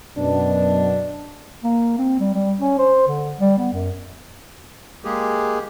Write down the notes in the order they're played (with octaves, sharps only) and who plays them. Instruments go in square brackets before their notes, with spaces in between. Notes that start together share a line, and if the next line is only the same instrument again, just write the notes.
[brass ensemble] F#2 B2 [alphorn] D4
[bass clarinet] A#3
C4
G3
G3
C#4
C5
D3
G3
B3
F#2
[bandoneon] G#3 A#3 G4 G#4